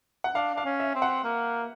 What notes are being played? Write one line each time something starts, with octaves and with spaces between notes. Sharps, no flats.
F#5
D4 F5
D4 F5
C#4
E5
C4
F#5
A#3